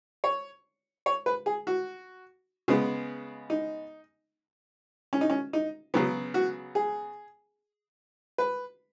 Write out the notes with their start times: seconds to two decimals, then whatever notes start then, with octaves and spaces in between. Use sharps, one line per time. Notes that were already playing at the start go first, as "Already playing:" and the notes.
0.24 C#5
1.06 C#5
1.26 B4
1.46 G#4
1.67 F#4
2.68 C#3 G#3 B3
3.50 D#4
5.13 C#4
5.21 D#4
5.30 C#4
5.53 D#4
5.94 C#3 F#3 B3 C#4
6.34 F#4
6.75 G#4
8.38 B4